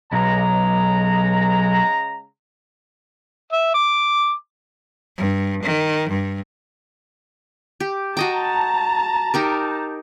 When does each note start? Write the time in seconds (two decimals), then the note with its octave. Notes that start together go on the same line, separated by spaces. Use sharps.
0.13 B1 C#3 G#3 A#5
3.53 E5
3.74 D6
5.17 G2
5.63 D#3
6.09 G2
7.80 G4
8.17 F#4 D#5 G5 A5 A#5
9.34 D#4 G4 A#4